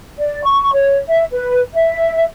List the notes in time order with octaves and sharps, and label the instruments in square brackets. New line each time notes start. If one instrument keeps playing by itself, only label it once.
[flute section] D5
C#6
C#5
E5
B4
E5